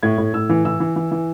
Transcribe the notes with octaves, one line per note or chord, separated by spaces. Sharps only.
A2 G#6
A2
A2 E6
E3
E3 E6
E3
E3
E3